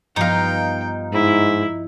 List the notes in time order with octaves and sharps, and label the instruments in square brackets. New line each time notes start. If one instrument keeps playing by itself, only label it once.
[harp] G2 F3 B3 [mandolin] D#4 F5 [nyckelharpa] G5
[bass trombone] G#2 [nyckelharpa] E4